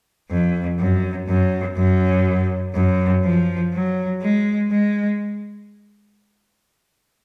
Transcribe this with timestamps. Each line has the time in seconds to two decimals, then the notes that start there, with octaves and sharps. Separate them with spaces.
0.31 F2
0.79 F#2
1.28 F#2
1.77 F#2
2.75 F#2
3.24 F3
3.74 F#3
4.22 G#3
4.72 G#3